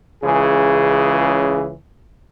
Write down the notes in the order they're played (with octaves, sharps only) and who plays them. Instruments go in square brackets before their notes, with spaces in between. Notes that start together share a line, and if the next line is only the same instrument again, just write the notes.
[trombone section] C#2 C#3 E3 G#4